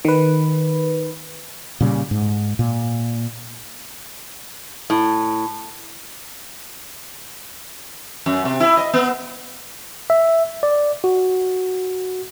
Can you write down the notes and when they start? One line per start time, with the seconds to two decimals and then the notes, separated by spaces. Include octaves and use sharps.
0.05 D#3 B4
1.81 A#2 C#3 G3
2.11 G#2
2.59 A#2
4.90 A2
8.26 F#2
8.45 C3
8.60 E4
8.77 D#5
8.93 B3
10.10 E5
10.63 D5
11.04 F#4